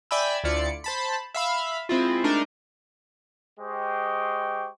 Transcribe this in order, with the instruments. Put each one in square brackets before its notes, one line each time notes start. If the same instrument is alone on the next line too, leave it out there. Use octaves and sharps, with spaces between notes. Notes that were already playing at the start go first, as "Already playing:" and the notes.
[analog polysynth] D5 E5 G5 G#5 B5 E6
D2 E4 F4 D5 C#7
C5 A5 B5
E5 F5 B5
G#3 C4 E4 F4
G#3 A3 D4 D#4 A#4
[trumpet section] G#3 G4 C5 D#5 G5 C#6